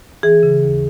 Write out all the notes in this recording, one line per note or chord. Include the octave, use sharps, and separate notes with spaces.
E3 G#4
C#3
D#2